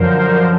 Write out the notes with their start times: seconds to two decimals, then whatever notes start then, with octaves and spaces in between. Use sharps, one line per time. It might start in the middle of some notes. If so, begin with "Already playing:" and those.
Already playing: F#2 D3 F3 A#4 C5